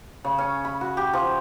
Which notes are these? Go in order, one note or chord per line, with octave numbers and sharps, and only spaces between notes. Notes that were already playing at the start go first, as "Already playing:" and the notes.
C#3
C#4
B5
F#4
G4
F3